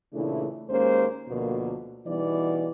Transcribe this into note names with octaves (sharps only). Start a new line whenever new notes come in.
A#2 C#3 E3 A3 D4 E4
D#2 G#3 A#3 C#4 C5
D2 B2 D3 F3 A#3
B2 E3 G3 B3 D#4 D5